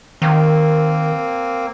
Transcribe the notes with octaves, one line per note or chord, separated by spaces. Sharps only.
D#3 A#3 C4